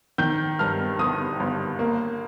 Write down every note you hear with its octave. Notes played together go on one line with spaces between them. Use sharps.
D#3 G6
G2 F6
G1 D#6
G1
A#3